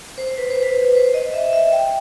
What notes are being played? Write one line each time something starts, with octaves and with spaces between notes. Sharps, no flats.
C5
B4
C5
B4
C5
D#5
E5
E5
G5